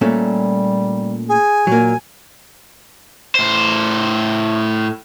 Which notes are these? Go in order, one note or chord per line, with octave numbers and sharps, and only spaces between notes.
A#2 G3 A3 C#4
G#4 G#5
A#2 F#3 A#3
A2 C5